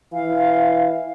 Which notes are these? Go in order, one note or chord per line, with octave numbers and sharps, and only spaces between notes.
E3 F5